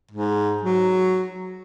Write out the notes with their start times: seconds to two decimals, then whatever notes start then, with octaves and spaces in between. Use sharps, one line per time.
0.11 G#2
0.62 F#3